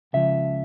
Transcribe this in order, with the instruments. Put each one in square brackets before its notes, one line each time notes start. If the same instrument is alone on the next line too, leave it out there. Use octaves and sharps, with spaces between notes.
[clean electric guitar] C#2 C#3 F3 E5